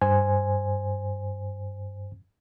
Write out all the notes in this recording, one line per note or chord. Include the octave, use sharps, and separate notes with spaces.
G2 C5 G#5